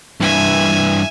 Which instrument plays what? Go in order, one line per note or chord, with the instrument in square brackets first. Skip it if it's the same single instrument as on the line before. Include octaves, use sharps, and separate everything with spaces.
[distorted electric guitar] G2 E3 [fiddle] E5 G#5